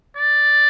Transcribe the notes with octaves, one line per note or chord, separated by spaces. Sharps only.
D5